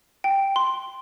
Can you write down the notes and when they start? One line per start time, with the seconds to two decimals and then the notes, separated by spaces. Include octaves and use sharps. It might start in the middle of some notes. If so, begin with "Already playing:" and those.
0.24 G5
0.56 C6